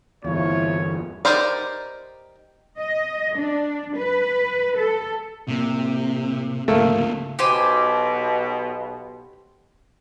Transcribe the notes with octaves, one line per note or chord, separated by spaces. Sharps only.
G1 E2 F3 E4 F4 C#5
D#4 G4 A#4 C5 D5
D#5
D4
B4
A4
A2 C3 A#3
D2 G#2 C#3 F3 A3 A#3
B1 B2 G4 C5 G#5